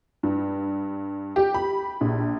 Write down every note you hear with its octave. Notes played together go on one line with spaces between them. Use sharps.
G2
G4
B5
A#1